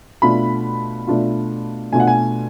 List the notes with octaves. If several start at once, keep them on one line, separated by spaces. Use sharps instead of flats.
B2 A3 D4 F4 B5
B2 A3 D4 F4
B2 A3 D4 F4 G#5
F#5
G#5